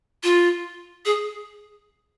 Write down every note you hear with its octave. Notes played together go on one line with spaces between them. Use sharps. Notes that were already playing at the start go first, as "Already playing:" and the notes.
F4
G#4